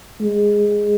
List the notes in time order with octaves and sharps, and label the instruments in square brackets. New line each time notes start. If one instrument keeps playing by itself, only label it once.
[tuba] G#3